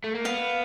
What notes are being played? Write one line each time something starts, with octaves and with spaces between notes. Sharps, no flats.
A3
A#3
B3 F5